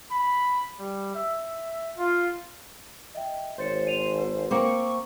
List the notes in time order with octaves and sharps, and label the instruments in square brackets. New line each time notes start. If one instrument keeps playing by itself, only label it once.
[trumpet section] B5
G3
E5
F4
[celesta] D#5 E5 G5
[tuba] G#1 [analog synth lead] C5 [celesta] C#5 A6 C#7
[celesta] D#7 F7
B4
[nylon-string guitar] A#3 C4 [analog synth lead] C#6 [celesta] D6